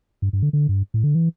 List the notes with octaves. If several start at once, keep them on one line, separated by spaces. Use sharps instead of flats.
G2
G2
D3
D3
G2
A2
D3
E3